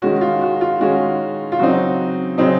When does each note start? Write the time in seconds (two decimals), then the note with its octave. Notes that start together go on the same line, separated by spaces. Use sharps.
0.02 D#3 G#3 C#4 F#4
0.21 F4
0.41 F#4
0.61 F4
0.80 D#3 G#3 C#4 F#4
1.52 F4
1.59 C#3 F#3 C4 D#4 F#4
2.38 C#3 F#3 C4 D#4